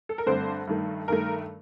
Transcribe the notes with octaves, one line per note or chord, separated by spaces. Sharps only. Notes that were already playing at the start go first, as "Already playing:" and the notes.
A4
A#4
G2 D3 A3 C4 C5
G2 D#3 A3
G2 D#3 A3 A#4